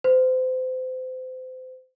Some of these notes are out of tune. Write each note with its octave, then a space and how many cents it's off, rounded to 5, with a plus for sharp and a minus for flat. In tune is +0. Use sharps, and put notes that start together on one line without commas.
C5 -30